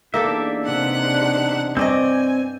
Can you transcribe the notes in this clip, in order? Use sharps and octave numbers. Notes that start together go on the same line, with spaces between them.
E2 A#3 D4 D#4 G4 A4 E5
C3 F#5 F#6
G2 C4 C5 D5 D#5 G#5